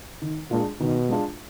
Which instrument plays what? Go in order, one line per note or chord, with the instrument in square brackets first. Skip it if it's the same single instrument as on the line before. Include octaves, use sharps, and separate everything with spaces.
[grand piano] D#3
[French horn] A#2 [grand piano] G#3 D4 F4
[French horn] B2 [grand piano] D#3
[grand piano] G#3 D4 F4